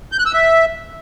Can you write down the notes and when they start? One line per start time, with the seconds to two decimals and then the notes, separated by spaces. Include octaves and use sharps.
0.12 G6
0.19 F#6
0.26 E6
0.33 E5